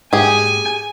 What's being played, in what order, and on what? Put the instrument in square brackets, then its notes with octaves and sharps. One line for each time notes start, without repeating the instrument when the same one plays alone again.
[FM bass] G#2 [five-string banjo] G4 G#4 [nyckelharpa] G#5